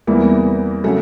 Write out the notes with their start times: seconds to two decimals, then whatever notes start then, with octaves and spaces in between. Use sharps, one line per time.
0.07 E2 C3 E3 G3 A#3
0.84 C#3 F#3 A3 C#4